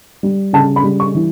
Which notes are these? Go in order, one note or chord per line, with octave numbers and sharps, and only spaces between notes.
G3
C#3 A5
B5
G3
C#6
E3